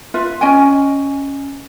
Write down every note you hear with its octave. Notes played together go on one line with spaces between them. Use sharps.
F4 B4 E5
C#4 D#5 G5 G#5